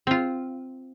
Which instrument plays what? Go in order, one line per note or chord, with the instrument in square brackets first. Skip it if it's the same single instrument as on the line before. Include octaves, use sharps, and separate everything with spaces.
[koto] C4 F4